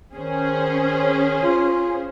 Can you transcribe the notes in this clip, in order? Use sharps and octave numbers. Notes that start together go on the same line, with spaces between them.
D#3 C#4 G#4 C5
F4